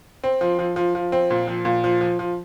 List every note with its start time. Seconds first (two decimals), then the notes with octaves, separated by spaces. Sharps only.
0.24 C4
0.41 F3
0.59 F3
0.76 F3
0.95 F3
1.12 C4
1.31 A#2
1.48 F3
1.65 A#2
1.84 F3
2.01 F3
2.19 F3